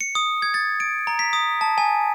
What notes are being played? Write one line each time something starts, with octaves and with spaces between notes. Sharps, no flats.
C#7
D#6
G#6
A6
D7
A#5
B6
D#6
A5
G#5